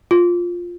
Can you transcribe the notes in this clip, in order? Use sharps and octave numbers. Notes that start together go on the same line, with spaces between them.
F4